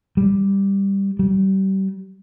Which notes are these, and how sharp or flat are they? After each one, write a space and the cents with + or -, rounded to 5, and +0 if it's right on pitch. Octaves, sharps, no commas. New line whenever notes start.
G3 +5
G3 -30